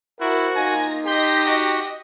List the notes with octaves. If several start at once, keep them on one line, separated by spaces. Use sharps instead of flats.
E4 F#4 A#4 C5
A#3 D#4 F4 G#5 A#6
G4 D#5 C6 G6 A#6 B6
F#4